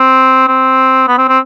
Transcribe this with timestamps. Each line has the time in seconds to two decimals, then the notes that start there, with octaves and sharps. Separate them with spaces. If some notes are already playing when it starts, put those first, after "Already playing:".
Already playing: C4
0.48 C4
1.08 B3
1.18 C4
1.28 C4